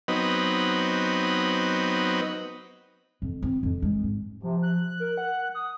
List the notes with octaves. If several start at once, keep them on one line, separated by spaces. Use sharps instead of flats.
F#3 B3 C4 D#4 B4
F2
C4
F2
G#3
G#1
C3 F3
F#6
A#4
F#5
D#6